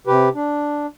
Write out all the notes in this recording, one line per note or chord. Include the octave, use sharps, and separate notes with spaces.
C3 G4 B4
D4